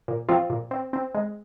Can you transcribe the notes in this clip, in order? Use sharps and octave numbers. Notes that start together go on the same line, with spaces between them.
A#2
F3 C4 F4
A#2
C4
C4
G#3